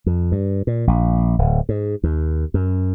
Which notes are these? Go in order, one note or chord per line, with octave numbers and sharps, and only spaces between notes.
F2
G2
A#2
A#1
D1
G#2
D#2
F#2